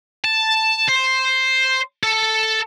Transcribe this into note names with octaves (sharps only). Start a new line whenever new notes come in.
A5
C5
A4